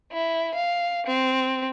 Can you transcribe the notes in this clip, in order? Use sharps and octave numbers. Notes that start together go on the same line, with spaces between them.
E4
F5
C4